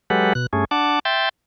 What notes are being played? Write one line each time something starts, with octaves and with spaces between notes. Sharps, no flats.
F#3 G#3 G4 A4 B4 F#5
B2 F#6
G2 A3 C#4 G#4
D4 F#5 A5 D6
E5 G5 C6 G6 A6